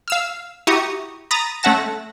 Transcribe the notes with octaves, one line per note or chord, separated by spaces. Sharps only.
F5 E6 F6
E4 F#4 G4 A#5 C#6 D#6
A#5 B5 D#6 A6 A#6
A3 C#4 E5 F#5 A5 A#6